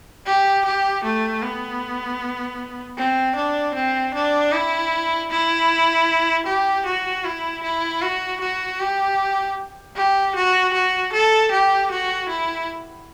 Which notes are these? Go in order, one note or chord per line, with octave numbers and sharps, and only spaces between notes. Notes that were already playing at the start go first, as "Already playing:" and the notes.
G4
G4
A3
B3
C4
D4
C4
D4
E4
E4
G4
F#4
E4
E4
F#4
F#4
G4
G4
F#4
F#4
A4
G4
F#4
E4